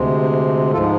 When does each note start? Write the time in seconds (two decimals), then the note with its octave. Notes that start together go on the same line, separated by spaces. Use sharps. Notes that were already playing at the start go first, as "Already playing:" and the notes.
Already playing: D2 C3 G#3
0.73 G#2 F3 G#3 F4 A4